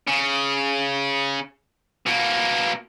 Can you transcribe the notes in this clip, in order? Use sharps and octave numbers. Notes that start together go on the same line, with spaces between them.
C#3
B2 A#3